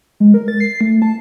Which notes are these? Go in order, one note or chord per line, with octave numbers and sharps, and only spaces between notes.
G#3
A#4
A6
C7
A3
A5